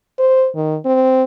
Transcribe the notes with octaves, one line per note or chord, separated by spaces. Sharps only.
C5
D#3
C4